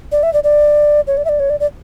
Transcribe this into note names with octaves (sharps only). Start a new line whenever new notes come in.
D5
E5
D5
D5
C#5
D5
E5
D5
C#5
D5
D5